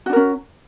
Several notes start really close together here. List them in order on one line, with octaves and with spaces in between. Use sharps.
F#4 D4 A#4 C#4